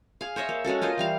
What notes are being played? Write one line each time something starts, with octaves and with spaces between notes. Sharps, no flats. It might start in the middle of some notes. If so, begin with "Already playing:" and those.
G#4 F5
C5 C#5 D#5 E5
A#3
G#3 C#4 F#4 A4
A#3 F4 C5 D#5
E3 G3 F5